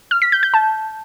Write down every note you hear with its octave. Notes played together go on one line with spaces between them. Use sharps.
F6
B6
G6
G6
A5